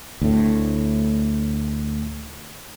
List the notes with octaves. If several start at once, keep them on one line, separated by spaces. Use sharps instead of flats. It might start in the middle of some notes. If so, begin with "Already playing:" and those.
D2 A2